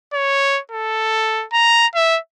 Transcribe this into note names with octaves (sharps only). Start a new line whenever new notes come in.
C#5
A4
A#5
E5